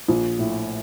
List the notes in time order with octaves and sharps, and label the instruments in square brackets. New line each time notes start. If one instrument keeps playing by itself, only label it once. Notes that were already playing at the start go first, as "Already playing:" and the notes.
[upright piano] A#1
A2